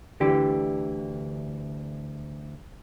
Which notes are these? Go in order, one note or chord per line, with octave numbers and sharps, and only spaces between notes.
D2 D3 E3 G4